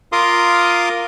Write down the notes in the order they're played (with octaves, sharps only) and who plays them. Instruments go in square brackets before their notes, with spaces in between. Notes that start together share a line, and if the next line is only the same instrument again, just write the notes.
[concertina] F4 A#4 F5 C6 D6 D#6